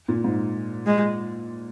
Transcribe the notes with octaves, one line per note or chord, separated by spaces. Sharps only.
A#2
G#2
G#3